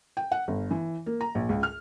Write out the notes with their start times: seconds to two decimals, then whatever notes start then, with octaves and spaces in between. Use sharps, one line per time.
0.17 G5
0.32 F#5
0.48 G1
0.71 E3
1.06 A#3
1.21 A#5
1.35 A#1
1.49 C#2
1.63 F6